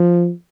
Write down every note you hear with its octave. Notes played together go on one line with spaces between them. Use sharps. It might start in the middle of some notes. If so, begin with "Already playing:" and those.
Already playing: F3